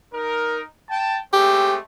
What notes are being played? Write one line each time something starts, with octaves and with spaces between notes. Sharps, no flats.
D#4 A#4
G5 A5
G#3 A3 C4 G4